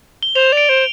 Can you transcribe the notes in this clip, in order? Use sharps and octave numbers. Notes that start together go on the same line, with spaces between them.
G7
C5 F7
D5 D7
C5